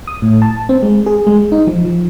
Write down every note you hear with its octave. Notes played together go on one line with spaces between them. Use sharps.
D#6
A2
A5
C4
G#3
G#4
G#3
D#4
F3
F3